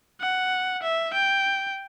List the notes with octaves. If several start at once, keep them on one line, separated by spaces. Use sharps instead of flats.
F#5
E5
G5